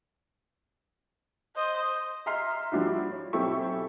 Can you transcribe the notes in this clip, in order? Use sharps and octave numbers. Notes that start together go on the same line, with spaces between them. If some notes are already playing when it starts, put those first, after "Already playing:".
C5 D#5
D#5 E5 A#5 C6 F6 C7
F3 G3 D4 E4 F#4
C#5
B1 C4 E4 G4 A4 C#6